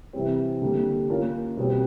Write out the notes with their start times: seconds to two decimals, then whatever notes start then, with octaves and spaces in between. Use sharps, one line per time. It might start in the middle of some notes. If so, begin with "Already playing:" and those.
0.13 C3 E3 G3 C4
0.62 D3 G3 A#3
1.10 A#3 C#4 F4 A#4
1.57 B2 G3 C4